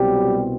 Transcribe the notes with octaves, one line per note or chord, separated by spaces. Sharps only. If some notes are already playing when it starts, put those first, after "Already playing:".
Already playing: C2 B2 F#3 G3 C4 G4